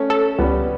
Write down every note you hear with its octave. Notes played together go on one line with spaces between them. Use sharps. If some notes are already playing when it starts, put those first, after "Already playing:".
Already playing: A3 C#4
A4
C#2 G3 B3